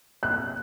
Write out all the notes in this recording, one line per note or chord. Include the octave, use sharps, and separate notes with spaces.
F#6